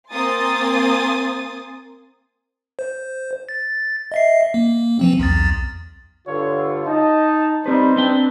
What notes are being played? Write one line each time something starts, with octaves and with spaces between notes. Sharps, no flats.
A#3 C4 G#5 C6 D#6 A6
C5
A6
D#5 E5 C7
A#3
E3 F3 C4
B1 E2 A6
G2 D3 F4 C#5
D#4 D#5 A5
G3 C4 D#4 B4 C5
C4 D4 B4 G5